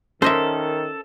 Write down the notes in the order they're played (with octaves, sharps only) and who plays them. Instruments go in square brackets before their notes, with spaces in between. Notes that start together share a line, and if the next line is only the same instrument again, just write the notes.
[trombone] D#3 [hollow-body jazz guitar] C#4 A#4 [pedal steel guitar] A4 [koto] C5 D#5 E5